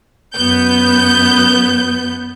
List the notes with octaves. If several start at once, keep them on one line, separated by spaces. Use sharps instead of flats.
F#2 B3 G6